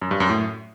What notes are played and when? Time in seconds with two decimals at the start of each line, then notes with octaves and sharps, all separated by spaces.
0.02 F#2
0.11 G2
0.20 F#2
0.30 A2